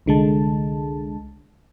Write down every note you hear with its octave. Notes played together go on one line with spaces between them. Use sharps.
C2 D3 G#3 A5